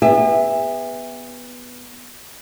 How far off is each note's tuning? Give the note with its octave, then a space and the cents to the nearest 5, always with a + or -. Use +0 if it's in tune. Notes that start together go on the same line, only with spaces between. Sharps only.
B3 +0 G#4 -45 E5 +0